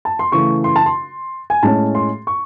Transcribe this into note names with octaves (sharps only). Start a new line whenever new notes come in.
A5
C6
C#3 E3 A3 C#6
C6
A5
C6
G#5
A2 G#3 C#4 A5
C6
C#6